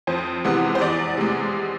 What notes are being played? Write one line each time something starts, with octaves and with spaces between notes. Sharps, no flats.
F2 C5
C3 E3 G#3 B3
C5
E2 D5
C3 G#3